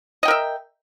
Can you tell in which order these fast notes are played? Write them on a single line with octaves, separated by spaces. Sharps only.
D#5 G5 A#4 E5